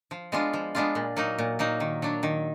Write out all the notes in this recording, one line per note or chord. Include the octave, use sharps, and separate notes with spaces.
F3
G#3 B3 D4 F4
F3
G#3 B3 D4 F4
A#2
F#3 A#3 D#4
A#2
F#3 A#3 D#4
D#3
F#3 D4
D#3